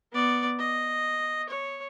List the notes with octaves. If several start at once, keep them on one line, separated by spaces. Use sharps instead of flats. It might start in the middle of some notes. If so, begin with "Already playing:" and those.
B3 D5
D#5
C#5